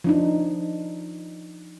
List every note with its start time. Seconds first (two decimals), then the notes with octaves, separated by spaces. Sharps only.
0.04 F3 D4 D#4